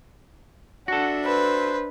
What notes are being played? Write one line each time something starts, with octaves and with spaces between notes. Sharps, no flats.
D4 F#4 A4 E5 F#5
B4 C5